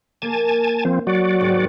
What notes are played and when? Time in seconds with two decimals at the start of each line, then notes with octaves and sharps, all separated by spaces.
0.22 A#3 G#5 A5
0.85 F3 C4
1.07 F#3 F#4 D5
1.41 G#1